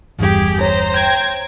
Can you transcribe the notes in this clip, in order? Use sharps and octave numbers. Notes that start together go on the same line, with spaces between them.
G1 E2 G2 G4 G#4
C5 C#5 A#5
G5 G#6